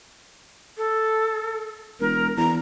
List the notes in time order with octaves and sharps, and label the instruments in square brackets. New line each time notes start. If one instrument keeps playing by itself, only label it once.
[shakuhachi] A4
[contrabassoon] E1 [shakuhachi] A#4
[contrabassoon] E2 [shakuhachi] A#5